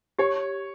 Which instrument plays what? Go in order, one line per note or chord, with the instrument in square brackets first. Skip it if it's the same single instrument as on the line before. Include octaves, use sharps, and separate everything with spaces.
[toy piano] G4 [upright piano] C#5